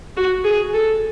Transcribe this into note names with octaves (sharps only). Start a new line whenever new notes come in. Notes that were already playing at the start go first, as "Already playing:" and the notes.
F#4
G#4
A4